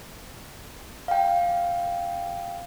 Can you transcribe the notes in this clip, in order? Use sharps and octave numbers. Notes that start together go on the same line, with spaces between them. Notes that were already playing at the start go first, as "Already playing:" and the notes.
F5 G5